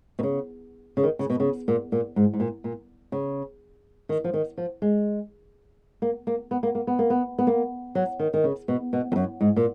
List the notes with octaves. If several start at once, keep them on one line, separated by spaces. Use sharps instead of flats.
B2
C#3
C#3
D#3
C#3
B2
C#3
A#2
A#2
G#2
G#2
A#2
A#2
C#3
D#3
F3
D#3
F3
G#3
A#3
A#3
B3
A#3
A#3
B3
A#3
B3
B3
A#3
F#3
D#3
D#3
C#3
B2
B2
F2
F#2
G#2
A#2